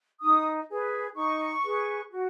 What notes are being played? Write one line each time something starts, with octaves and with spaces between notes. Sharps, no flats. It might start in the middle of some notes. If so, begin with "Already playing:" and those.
D#4 D#6
G#4 B4
D#4 C#6
G#4 B4
F#4